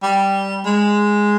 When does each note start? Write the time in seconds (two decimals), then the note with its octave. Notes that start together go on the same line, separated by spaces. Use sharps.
0.03 G3
0.66 G#3